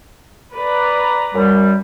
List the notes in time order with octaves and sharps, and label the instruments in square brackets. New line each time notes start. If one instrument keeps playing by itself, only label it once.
[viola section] B4 D5 A#5
[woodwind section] F#2 G3